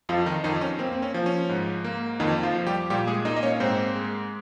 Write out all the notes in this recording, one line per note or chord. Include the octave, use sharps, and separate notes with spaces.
F2 F3 F4
D#3 D#4
F2 D#3 D#4
C#4
A#3 C4
C4
C#4
F3
C#4
G#2
A#3
F2 D#3 D#4
F3 F4
F3
G3 G4
A#2 G3 G4
G#3 G#4
A#3 D#4 D#5
D#5
C#4 C#5
G#2 C4 C5
G#3